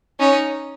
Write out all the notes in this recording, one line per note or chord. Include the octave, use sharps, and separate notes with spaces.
C#4 D#4